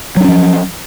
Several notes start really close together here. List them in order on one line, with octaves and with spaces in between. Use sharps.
F#3 D4 C#4 F3